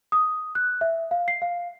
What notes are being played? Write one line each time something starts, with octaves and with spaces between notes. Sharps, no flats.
D#6
F#6
E5
F5
C7
F5